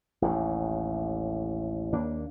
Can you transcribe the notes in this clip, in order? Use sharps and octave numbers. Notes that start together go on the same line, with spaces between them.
A1 D#2 A2
D#2 A#3 D4